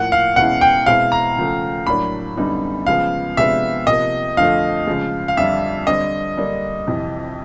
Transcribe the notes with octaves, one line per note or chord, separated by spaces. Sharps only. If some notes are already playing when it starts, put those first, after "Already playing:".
Already playing: A2 F3 A#3 F#5
F5
E2 B2 G#3 C#4 E4 F#5
G5
B2 G#3 C4 E4 F5
A#5
C#3 F3 A3
A2 F#3 A#3 D4 B5
F#2 D3 G3 B3 D#4
C#3 F3 G#3 B3 F5
C3 F3 G#3 B3 D4 E5
C3 F3 A#3 D#5
F2 D3 F3 A3 F5
C#3 F3 G#3
F5
F2 D3 G3 E5
D3 G3 C4 D#5
D3 G3 A#3 D4
F2 C3 E3